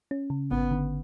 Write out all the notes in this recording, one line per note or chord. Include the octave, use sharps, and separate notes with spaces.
C#4
C#3
G#1 B3
D3